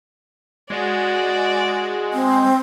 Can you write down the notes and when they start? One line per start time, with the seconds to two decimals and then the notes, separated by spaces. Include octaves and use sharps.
0.70 G#3 F#4 D5
2.13 C4